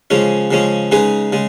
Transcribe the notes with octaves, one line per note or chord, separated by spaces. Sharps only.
C#3 F3 G#3 C#4
C#3 F3 G#3 C#4
C#3 G#3 D#4 G#4 B4
C#3 G#3